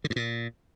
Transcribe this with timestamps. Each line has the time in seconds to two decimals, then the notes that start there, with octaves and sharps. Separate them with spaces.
0.04 D3
0.10 G2
0.16 A#2